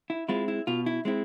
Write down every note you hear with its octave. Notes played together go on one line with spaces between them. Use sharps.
E4
G#3 C4 E4 F4
E4
B2 F4
E4
G#3 C4 E4